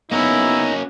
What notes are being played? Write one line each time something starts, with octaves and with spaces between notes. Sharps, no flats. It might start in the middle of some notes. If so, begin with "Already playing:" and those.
A#3 B3 C#4 D#4 E4 F#4 A#5